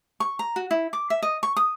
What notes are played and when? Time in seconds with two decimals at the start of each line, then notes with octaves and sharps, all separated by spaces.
0.20 C#6
0.39 A#5
0.56 F#4
0.71 E4
0.93 D6
1.10 E5
1.22 D#5
1.43 C#6
1.56 D#6